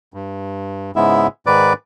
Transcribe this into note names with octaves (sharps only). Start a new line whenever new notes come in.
G2
G#2 C#3 G#3 B3 E4 E5
G#2 D#3 B4 D5 D6